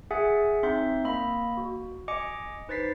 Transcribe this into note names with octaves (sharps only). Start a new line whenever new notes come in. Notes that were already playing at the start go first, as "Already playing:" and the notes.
G#4 E5 F#5 G#5
C4 D#4 E5 C6 G6
A#3 D#5 B5
F#4
D#5 G#5 D6 C#7
D#4 B4 C5 A6 B6 C7